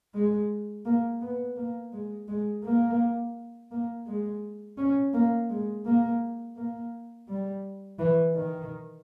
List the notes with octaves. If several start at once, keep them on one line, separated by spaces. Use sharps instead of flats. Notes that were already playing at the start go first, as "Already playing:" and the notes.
G#3
A#3
B3
A#3
G#3
G#3
A#3
A#3
G#3
C#4
A#3
G#3
A#3
A#3
G3
E3
D#3